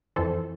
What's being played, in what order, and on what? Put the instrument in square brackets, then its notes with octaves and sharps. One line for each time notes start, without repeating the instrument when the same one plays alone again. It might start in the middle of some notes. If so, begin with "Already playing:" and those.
[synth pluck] F2 E3 A4 C5